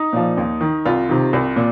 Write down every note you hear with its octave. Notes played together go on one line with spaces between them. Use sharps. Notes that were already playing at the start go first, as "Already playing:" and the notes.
Already playing: D#4
A#2 F3
D#2
D#3
C2 F4
C3 D#3
C2
A#2